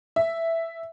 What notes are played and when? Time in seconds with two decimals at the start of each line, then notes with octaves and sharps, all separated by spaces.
0.16 E5